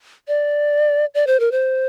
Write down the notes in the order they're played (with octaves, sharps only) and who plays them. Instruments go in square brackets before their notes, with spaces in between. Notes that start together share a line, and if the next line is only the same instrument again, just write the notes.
[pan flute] D5
D5
C5
A#4
C5